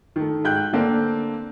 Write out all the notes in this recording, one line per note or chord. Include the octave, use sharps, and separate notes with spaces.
D#3 A3
G#2 G5 F#6 G6
D3 A3 A#3 C4 D4